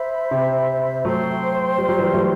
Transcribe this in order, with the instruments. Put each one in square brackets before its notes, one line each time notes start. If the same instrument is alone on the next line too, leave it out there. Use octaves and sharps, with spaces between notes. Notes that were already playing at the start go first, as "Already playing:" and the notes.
Already playing: [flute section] C5 E5 B5
[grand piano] C3
[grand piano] F#3 A3 [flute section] C5 G5 C6
[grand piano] G3
F#3
E3 G3
F#3 A3